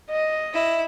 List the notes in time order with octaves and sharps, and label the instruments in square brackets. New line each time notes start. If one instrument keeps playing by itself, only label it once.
[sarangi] D#5
[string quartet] E4